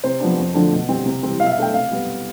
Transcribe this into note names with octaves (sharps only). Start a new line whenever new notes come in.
C3 C5
F3 B3 D4
F2
D3 F3 A3 D4
B2
G3 C4
C3
E3 G3 C4
B2 F5
E5
F5
A3 D4 G5
C3 F5
G3 B3